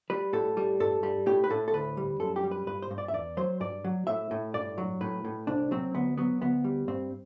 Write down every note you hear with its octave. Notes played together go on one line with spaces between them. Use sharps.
G3 B4
A2 A4
G3
G2 A4
G3
A2 G4
B4
A2 A4
A4
D2 B4
G3
F#2 A4
G4
G3
B4
G2 B4
C5
G2
D5
E5
E2 D5
F#3 C5
G2 D5
F#3
A2 E5
A2
G2 D5
F#3
A2 B4
A2
C2 D4
F#3 C4
D2 B3
F#3 B3
D2 B3
G3
G2 C4